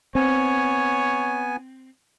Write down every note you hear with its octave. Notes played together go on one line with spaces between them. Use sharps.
B3 C4 C#5 G#5